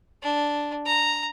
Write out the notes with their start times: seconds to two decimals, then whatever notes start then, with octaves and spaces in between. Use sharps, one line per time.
0.22 D4
0.86 A#5